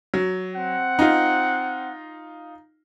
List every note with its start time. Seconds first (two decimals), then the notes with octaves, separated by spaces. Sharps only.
0.14 F#3
0.56 C4 F#5
0.99 D#4 F4